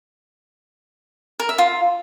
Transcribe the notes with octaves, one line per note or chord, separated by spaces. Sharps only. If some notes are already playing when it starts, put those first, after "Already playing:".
A#4
E5
F4